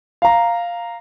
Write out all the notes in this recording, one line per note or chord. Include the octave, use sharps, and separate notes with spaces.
F5 A#5